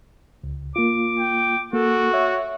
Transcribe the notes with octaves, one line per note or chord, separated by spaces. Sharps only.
C#2
A#3 F4 D6
G5
A#3 F#4 A4
C#5 E5